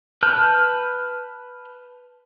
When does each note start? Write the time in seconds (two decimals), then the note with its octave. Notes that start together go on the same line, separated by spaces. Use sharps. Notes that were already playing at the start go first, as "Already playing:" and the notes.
0.23 B4 A5 F6 G6